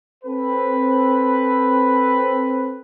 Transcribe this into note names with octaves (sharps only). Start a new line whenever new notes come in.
C4 A4 B4